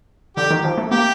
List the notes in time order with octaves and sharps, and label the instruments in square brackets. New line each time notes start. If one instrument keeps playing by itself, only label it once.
[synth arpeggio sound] D3 [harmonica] G4
[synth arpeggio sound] D#3
F3
A3
[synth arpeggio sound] A#3 [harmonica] G4